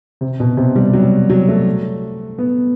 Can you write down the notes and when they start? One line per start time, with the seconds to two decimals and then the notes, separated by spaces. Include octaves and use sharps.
0.21 C3
0.40 B2
0.57 C3
0.76 G3
0.93 F#3
1.30 F#3
1.48 A3
2.39 B3